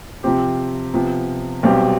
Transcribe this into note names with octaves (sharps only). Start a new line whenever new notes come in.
C3 F3 C4 G4
C3 F3 B3
B1 B2 G3 C4 G4